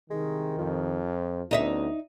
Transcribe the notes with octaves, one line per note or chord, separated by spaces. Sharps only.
C2 C3 D#3 G#3
F2 F3
D2 B3 C#4 D#4 D#5 E5